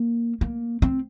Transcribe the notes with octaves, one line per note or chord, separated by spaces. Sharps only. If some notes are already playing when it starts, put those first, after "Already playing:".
Already playing: A#3
A#3
C4